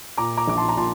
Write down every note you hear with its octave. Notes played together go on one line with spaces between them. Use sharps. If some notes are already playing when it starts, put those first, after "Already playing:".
A#2 A#5 D6
A#5 D6
A#1 D6
A5 C6
A#5
A#2 A5 C6